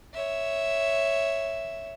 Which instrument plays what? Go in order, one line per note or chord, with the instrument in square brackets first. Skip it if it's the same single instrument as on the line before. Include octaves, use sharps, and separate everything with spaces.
[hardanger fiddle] C#5 E5